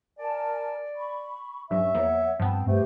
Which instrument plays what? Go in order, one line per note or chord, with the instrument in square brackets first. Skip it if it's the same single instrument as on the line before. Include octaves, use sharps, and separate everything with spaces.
[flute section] A#4 G#5 A5 [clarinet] D5
[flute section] B5 C#6
[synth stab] A#1 G2 F#3 [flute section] C#4 C#6 [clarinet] E5
[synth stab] E2 F3 A#3 [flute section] C#5 F#5
[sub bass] G2 [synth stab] F3 B3 [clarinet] C4 [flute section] A5
[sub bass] G2 [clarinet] A3 [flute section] G4 B4 C5